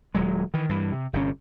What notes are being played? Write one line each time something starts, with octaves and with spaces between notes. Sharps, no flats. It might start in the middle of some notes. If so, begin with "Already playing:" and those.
D#1 F#3 G#3
D#3 E3
G2 E3
C3
G1 C3 D#3 C#4